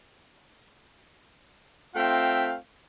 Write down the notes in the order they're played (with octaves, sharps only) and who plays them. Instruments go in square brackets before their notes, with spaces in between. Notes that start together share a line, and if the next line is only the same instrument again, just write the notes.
[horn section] A3 C4 F4 E5 F5 G5